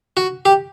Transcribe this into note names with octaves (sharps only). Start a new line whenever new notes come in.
F#4
G4